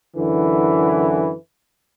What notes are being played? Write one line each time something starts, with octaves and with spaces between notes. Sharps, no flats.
F#2 D3 E3